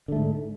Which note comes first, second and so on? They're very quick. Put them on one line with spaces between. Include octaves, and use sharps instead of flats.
D3 A3 G#2